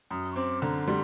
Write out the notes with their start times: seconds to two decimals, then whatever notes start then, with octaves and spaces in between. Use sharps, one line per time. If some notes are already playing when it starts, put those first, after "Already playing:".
0.11 F#2 D#6
0.32 C#6
0.36 C4 D6
0.62 D3 A#5
0.87 G3 C6